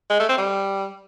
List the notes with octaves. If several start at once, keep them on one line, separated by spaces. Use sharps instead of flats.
G#3
A3
C4
G3